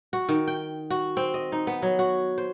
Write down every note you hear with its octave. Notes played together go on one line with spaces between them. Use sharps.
F#4
D#3
G5
F#4
C4
D#5
D#4
B3
F#3
F#4
C5